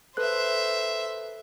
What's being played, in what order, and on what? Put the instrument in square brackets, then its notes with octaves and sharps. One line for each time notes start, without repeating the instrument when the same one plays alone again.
[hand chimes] A4 B4 F#6 [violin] C5 E5